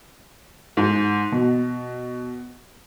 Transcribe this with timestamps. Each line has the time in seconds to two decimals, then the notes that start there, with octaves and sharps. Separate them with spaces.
0.77 G#2
1.32 B2